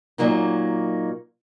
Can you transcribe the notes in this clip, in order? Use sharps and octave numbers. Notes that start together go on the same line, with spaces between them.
A#2 F#3 A#3 D#4